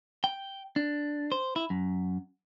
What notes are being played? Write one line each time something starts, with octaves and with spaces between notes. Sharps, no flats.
G5
D4
C5
E4
F#2